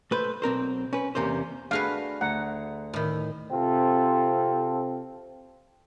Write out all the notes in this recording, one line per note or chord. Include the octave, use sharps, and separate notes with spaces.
A3 B4 C5
B1 C4 A#4 C5
C#4 B4
E2 C3 A#3 C#4 C5
A3 D4 F#4 G#4 B4 F5
D2 F#5 A#5
A2 D#3 E4 B4 B5
C3 C4 F4 A4